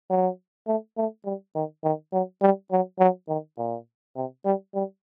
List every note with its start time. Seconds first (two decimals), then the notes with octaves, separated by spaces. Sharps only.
0.10 F#3
0.67 A3
0.97 A3
1.25 G3
1.55 D#3
1.84 D#3
2.13 F#3
2.41 G3
2.71 F#3
3.00 F#3
3.28 D#3
3.58 A#2
4.16 C3
4.45 G3
4.74 G3